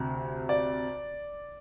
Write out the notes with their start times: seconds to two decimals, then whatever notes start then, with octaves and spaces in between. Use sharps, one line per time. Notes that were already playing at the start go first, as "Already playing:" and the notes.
Already playing: D2 C3
0.49 D5